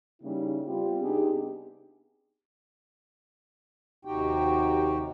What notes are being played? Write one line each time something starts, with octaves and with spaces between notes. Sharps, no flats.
C#3 G3 A#3 C#4 D#4 E4
G3 B3 C4 F4 G4
C3 B3 D4 D#4 G4 G#4
D#2 C3 D#4 F#4 G4 G5